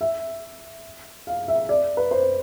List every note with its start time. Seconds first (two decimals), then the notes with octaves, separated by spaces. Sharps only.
0.01 E5
1.27 F5
1.48 E5
1.69 D5
1.97 B4
2.11 C5